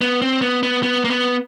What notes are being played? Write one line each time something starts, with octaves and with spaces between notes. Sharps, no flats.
B3
C4
B3
B3
B3
A#3
B3